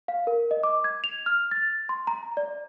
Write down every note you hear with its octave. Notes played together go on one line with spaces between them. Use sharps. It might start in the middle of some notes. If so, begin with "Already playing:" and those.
F5
A#4
D#5
D6
G#6
F7
F6
A6
C6
A#5
D5